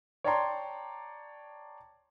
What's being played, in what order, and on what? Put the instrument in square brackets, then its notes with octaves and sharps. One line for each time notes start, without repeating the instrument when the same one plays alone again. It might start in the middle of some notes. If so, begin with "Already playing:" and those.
[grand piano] C#5 D5 G5 A5 A#5 C6